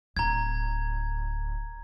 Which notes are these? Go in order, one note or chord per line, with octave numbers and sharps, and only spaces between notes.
D1 A#5 G#6